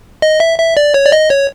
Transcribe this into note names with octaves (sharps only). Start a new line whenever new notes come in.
D#5
E5
E5
D5
C#5
D5
D#5
C#5